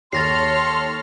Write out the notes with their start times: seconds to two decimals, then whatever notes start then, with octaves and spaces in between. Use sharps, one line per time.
0.13 D#2 A4 C#5 C6 F6 A6 A#6 C7